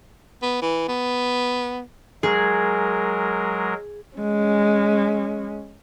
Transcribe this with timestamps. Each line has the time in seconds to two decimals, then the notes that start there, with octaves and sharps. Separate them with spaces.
0.42 B3
0.62 E3
0.88 B3
2.23 F#3 G#3 G#4 A#4
4.17 G#3 C#4